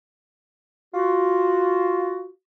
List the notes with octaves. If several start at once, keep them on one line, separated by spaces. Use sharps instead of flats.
F4 F#4